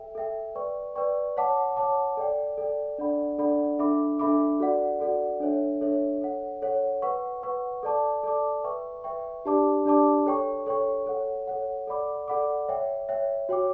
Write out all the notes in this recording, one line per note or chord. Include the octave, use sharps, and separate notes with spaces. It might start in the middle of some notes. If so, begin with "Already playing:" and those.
Already playing: A4 E5 G5
A4 E5 G5
B4 D5 G5 C#6
B4 D5 G5 C#6
C#5 F#5 A5 D6
C#5 F#5 A5 D6
A4 D5 G5
A4 D5 G5
D4 A4 D5 F#5 B5
D4 A4 D5 F#5 B5
D4 A4 E5 B5 D6
D4 A4 E5 B5 D6
F#4 A4 D5 F#5
F#4 A4 D5 F#5
D4 A4 C#5 E5
D4 A4 C#5 E5
A4 C#5 F#5
A4 C#5 F#5
B4 F#5 C#6
B4 F#5 C#6
A4 D5 A5 D6
A4 D5 A5 D6
B4 E5 G5 C#6
B4 E5 G5 C#6
D4 G4 D5 A5 D6
D4 G4 D5 A5 D6
A4 C#5 G5 C#6
A4 C#5 G5 C#6
A4 C#5 F#5
A4 C#5 F#5
A4 D5 F#5 B5 D6
A4 D5 F#5 B5 D6
C#5 E5 G5
C#5 E5 G5
F#4 C#5 G5 D6